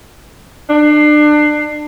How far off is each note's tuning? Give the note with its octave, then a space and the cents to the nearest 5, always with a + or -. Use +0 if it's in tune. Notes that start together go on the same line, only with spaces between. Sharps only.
D4 +30